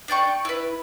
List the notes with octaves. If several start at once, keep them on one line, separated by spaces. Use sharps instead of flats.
D4 D5 G5 C#6
E4 B4